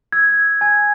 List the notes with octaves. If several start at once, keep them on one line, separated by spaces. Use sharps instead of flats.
E6 G#6
G6
G#5 G#6